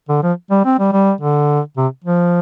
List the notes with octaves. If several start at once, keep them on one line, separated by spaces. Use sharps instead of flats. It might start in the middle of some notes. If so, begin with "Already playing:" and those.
D3
F3
G3
C4
G3
G3
D3
C3
F3